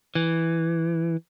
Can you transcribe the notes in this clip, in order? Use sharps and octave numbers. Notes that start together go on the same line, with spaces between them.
E3